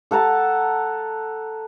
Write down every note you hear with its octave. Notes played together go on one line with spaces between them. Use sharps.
A4 F#5 A5 A#5